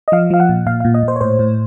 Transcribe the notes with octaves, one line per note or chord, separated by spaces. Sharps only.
D#5
F3 F5
F3 F5
F#5
A#2
A#2 F5
F5
A#2
D#5
A#2
C5
C#5
A2 C5
A2